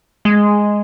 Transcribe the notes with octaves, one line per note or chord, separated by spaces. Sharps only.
G#3